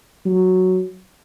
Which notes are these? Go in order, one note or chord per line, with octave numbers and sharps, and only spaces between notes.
F#3